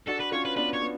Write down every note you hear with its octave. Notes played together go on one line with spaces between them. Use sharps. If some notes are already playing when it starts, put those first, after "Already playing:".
D4 F#4 A4
B4
C#4 F4 C#5
B4
B3 D4 B4
C#5
B3